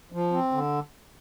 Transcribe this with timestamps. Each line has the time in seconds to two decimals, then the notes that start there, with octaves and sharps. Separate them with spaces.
0.12 F3
0.32 C4
0.52 D3